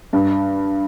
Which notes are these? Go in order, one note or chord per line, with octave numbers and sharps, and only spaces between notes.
G2